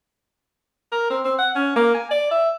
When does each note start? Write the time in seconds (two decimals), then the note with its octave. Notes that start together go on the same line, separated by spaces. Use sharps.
0.92 A#4
1.10 C4
1.25 C4
1.39 F#5
1.55 C#4
1.76 A#3
1.95 G#5
2.11 D5
2.31 E5